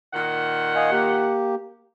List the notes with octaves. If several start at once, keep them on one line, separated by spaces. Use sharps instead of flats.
A#2 D#3 F#5
D#5 F5 G#5
A#3 G4